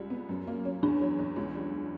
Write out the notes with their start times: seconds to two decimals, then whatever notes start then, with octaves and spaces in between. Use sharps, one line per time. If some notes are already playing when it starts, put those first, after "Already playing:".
Already playing: C#2 G3
0.10 B3
0.29 F#2
0.47 A#3
0.65 C#4
0.83 E2 D4
1.01 F#3
1.19 E2
1.36 C#2
1.55 G3